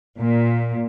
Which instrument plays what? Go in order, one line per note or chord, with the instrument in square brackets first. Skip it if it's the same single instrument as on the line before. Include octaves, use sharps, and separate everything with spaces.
[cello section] A#2